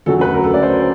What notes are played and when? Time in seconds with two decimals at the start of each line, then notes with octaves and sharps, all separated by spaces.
0.06 D2 C#3 F#3 A4
0.21 B4
0.34 A#4
0.44 A4
0.54 D5
0.63 C5